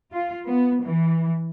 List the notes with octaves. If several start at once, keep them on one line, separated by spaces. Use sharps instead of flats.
F4
B3
E3